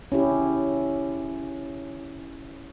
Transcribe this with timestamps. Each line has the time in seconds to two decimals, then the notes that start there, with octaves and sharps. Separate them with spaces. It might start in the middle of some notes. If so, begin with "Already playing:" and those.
0.12 C#4 E4 G4